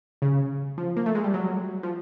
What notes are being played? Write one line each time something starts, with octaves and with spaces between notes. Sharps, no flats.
C#3
F3
A#3
A3
G#3
G3
F#3
F3